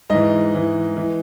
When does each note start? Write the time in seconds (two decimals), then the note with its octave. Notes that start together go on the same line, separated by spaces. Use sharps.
0.10 G#2 E3 D#5
0.54 G#2 E3
0.97 E3